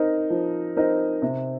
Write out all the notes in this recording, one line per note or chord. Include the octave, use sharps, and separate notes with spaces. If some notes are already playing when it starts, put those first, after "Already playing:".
Already playing: C4 D#4 A#4 D#5
F3
C4 D#4 A#4 D#5
C3